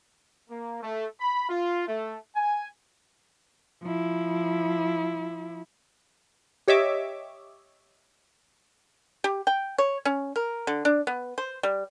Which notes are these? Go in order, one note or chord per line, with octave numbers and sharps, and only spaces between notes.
A#3
A3
B5
F4
A3
G#5
F3 E4
G4 C#5 D#5 E5 D6
G4
G5
C#5
C#4
A#4
D3
D4
B3
C5
G3